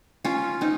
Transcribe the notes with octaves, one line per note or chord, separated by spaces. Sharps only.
C#4 F4
C4 D#4